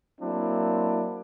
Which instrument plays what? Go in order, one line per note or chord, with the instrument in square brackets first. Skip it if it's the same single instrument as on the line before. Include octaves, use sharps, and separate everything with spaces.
[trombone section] F#3 A#3 C4 D4 E4